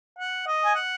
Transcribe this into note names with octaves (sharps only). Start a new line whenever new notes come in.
F#5
D#5
G#5
F#5